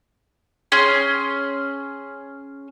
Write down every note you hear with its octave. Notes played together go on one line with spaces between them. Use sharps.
C#4 G#4 C6